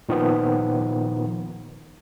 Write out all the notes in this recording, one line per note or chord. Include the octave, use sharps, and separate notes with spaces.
A#2 D#3 F3 B3